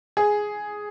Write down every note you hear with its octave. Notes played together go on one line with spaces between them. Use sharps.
G#4